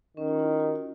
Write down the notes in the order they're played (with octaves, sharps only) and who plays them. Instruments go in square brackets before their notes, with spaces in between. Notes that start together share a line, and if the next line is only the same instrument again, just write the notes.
[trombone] D#3 [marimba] C#4
[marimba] F4
E4
F#4
F#4